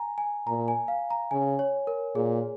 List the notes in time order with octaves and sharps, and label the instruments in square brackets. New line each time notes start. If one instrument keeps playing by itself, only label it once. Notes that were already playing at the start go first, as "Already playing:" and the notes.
Already playing: [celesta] G#5 A#5
G#5
[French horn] A#2 [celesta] A#5
[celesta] G#5
F5
A#5
[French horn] C#3 [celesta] G#5
[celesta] C#5
A#4
[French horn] A#2 [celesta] G#4